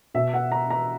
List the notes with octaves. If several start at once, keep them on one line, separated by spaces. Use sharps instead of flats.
B2 E5
F#5
A#5
A#5